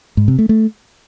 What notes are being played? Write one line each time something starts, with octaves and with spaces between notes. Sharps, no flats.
G#2
C3
A3
A3